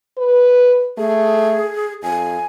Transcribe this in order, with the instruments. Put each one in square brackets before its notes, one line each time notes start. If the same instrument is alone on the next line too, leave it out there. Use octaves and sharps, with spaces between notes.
[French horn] B4
[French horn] A3 [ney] G#4
[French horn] F2 [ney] G#5